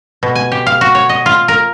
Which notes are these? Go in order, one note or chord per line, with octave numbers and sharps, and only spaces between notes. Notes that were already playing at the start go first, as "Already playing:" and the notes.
B2
G#5
G4
F5
F#4
C#5
D#5
F4
A#4